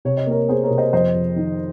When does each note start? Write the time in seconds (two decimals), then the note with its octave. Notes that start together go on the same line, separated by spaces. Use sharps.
0.05 C3 C#5
0.17 D#5
0.27 A#3 A#4 C#5
0.49 A#3 G#4 C5
0.64 A#4 C#5
0.70 C3
0.78 C5 D#5
0.93 F2 C5 D#5
1.15 F2
1.36 D#3